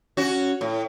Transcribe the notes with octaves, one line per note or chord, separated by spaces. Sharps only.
C#4 F#4
A2